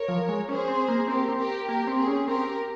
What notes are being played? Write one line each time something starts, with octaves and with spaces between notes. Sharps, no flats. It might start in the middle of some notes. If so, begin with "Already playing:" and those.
Already playing: A#4 C#5
F3
G#3
C#4 G#4 C5
C4
A#3
C4 G4 A#4
C4
G4 A#4
A#3 G4 A#4
C4
G#4
C#4
C4 G4 A#4